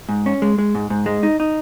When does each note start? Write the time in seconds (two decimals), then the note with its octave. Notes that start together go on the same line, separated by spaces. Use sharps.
0.09 G#2
0.26 C#4
0.42 G#3
0.59 G#3
0.75 G#2
0.90 G#2
1.06 G#3
1.23 D#4
1.40 D#4